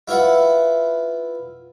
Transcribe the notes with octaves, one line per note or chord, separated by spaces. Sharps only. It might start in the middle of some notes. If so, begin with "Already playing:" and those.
E4 F4 B4 E5 F#5